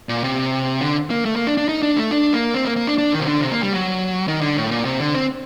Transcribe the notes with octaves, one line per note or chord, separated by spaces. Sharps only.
A#2
C3
D3
A#3
A3
A#3
D4
D4
D#4
D4
A3
D4
A#3
C4
A#3
A#3
D4
D4
D#3
C3
D3
C3
A#3
G3
F#3
D#3
D3
A2
A#2
C3
D3
C4